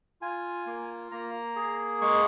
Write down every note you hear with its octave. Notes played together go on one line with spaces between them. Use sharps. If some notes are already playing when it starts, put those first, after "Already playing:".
F4 G#5
A#3
A#3 A#5
G#4
G#3 C#6